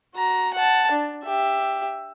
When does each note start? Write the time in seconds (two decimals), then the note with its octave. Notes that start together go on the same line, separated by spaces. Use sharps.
0.14 F#4 A#5
0.54 F#5 A5
0.91 D4
1.24 G4 E5